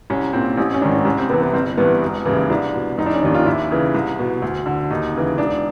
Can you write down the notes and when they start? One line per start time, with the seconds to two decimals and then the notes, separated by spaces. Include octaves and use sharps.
0.10 C2 C#4
0.33 A#2 C4
0.57 A1 C#4
0.74 C#4
0.81 G#2 D#3 D4
0.96 D4
1.05 C2 C#4
1.18 C4
1.29 C3 E3 B3
1.42 B3
1.53 G1 C4
1.77 G2 E3 B3
2.02 E1
2.26 D#2 C#3 E3
2.50 C2 D4
2.74 B2
2.98 F1 D#4
3.06 D4
3.14 C#4
3.22 D#2 D#3 D4
3.34 F4
3.46 D#2 E4
3.71 C#3 E3
3.94 C2
4.19 B2
4.42 D2
4.66 D3
4.91 D#2 D#4
5.15 C#3 E3
5.38 E1 D4